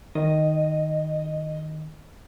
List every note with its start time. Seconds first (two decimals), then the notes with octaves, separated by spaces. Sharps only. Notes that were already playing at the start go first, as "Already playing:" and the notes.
0.15 D#3 D#5